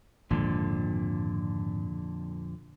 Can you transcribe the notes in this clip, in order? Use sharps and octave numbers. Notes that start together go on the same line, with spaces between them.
G#1 F2 A#2 D3